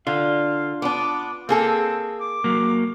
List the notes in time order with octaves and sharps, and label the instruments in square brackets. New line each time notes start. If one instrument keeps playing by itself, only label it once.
[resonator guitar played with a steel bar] D3 [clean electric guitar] F4 [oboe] F5
[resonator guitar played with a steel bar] B3 D4 [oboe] D6
[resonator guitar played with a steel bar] A#3 G#4 A4 [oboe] C4
[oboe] D6
[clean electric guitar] F#3 A#3